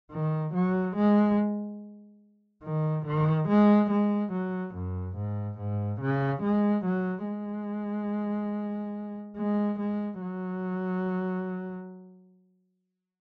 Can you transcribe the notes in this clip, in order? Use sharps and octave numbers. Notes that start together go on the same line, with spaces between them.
D#3
F#3
G#3
D#3
D#3
G#3
G#3
F#3
F#2
G#2
G#2
C#3
G#3
F#3
G#3
G#3
G#3
F#3